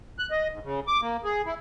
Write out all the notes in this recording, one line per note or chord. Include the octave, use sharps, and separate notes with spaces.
F#6
D#5
G#2
C#3
D6
A#3
G#4
E4